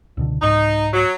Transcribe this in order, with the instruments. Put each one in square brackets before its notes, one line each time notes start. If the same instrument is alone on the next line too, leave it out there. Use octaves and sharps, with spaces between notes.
[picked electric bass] C#2 B2 D3
[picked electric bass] C2 G#2 [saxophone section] D#4
[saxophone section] F#3